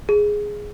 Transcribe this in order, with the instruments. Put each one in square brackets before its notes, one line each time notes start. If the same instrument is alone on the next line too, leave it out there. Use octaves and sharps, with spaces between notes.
[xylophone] G#4